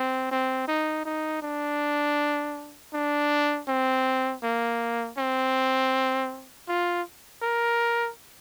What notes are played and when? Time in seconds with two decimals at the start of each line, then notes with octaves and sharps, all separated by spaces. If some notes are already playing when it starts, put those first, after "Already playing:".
Already playing: C4
0.31 C4
0.68 D#4
1.05 D#4
1.43 D4
2.94 D4
3.68 C4
4.43 A#3
5.18 C4
6.68 F4
7.42 A#4